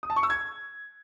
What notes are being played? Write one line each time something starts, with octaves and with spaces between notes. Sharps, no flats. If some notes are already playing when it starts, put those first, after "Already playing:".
D#6
A5
C#6
E6
G#6